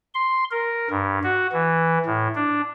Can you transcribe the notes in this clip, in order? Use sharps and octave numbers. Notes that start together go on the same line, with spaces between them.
C6
A#4
G2
F#4
E3
A2
D4